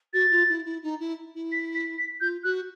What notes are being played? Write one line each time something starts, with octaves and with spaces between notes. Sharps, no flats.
F#4 A6
F4
E4
E4
D#4
E4
E4
B6
B6
B6
F4 G6
F#4 F#6